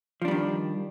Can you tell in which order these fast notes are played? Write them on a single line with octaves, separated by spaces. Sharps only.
F3 D4 G3 D#3